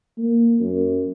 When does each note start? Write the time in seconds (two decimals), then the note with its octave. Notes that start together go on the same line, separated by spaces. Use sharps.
0.18 A#3
0.60 F#2